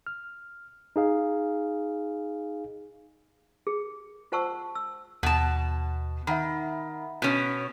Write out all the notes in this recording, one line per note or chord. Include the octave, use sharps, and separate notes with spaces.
F6
D#4 G#4 F5
G#4
F4 C5 F#5 A5 C#6 E6
E6
D#2 B2 A5
D#3 E5 F#5 B5
B2 C#4